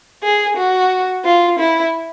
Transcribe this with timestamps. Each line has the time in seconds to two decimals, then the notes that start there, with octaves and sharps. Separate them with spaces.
0.23 G#4
0.57 F#4
1.25 F4
1.59 E4